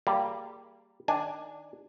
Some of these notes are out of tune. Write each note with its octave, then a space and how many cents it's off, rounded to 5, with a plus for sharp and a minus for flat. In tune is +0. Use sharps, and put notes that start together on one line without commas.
G3 -10 A#3 -20 G#4 +0
D#3 -5 D4 +0 G#5 +0